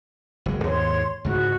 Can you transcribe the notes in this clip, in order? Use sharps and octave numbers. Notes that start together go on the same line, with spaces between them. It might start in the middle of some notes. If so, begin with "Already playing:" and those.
F#1 G#3
D#2 G#2 C#5 C6
C#2 G#2 F#4